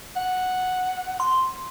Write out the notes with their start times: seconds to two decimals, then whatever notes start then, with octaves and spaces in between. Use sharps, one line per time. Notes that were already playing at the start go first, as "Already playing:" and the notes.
0.16 F#5
1.20 C6